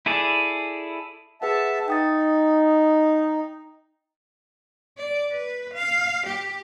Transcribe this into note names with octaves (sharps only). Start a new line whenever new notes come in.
E4 G#4 A4 D5
G#4 B4 E5 F#5 A5
D#4 G5 D#6 A6
D5
B4
F5
G4